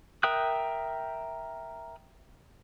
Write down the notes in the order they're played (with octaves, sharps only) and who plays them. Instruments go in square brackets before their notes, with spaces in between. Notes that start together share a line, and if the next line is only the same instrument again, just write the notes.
[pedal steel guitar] A#4 E5 G5 D#6 F#6